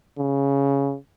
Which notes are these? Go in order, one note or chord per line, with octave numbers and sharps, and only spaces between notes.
C#3